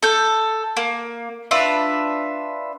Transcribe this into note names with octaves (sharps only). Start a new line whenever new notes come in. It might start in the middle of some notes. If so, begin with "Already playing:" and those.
A4 G6
A#3
D4 F4 B4 E5